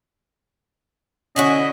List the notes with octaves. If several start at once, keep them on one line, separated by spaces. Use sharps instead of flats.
D3 C#4 E4 F#4 D#5